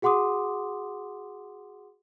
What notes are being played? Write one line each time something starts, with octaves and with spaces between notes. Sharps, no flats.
F#4 G#4 F#5 C6 D6 D#6